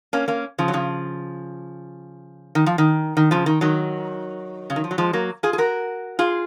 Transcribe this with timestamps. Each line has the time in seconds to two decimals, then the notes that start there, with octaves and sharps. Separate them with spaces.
0.13 A#3 C#4
0.28 A#3 C#4
0.58 C#3 F3
0.68 F#3
0.73 C#3 F3
2.55 D#3
2.66 F3
2.78 D#3
3.17 D#3
3.31 C#3 F3
3.46 D#3
3.61 D#3 F#3
4.70 C#3
4.76 D#3
4.84 F3
4.91 F#3
4.98 F3 G#3
5.13 F#3 A#3
5.43 F4 G#4
5.53 G#4
5.58 F#4 A#4
6.19 F4 G#4